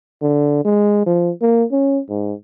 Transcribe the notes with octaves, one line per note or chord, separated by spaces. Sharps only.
D3
G#3
F3
A#3
C#4
G#2